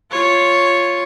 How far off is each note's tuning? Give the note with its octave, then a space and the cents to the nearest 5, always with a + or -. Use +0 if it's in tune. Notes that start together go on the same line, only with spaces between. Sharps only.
F4 +0 C#5 +0